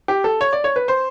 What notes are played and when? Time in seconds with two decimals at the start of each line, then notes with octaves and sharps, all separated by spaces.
0.08 G4
0.24 A4
0.41 C#5
0.53 D5
0.64 C#5
0.76 B4
0.88 C5